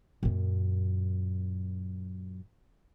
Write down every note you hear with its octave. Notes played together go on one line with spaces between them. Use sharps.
F#2 A#2